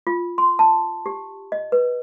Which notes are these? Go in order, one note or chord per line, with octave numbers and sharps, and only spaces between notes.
F4
C6
A5
G4
D#5
B4